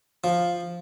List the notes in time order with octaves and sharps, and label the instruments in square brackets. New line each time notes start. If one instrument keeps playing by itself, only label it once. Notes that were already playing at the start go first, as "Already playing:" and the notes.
[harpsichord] F3